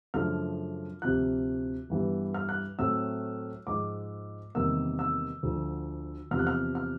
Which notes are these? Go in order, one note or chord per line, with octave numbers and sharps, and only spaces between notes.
F#2 C#3 F3 A3 D4 F6
D2 C3 F3 F#6
G2 E3 G3 B3
F6
F#6
A2 F#3 A3 C4 E6
G#2 F3 G#3 D6
E2 C3 D#3 G3 A#3 E6
E6
D2 D3 F3
E2 C3 F3 F6
F#6
F6
F6